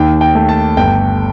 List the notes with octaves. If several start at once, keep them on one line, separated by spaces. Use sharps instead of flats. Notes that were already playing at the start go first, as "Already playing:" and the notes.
Already playing: D#2 D#3 G5
G5
A3
A5
G1 G5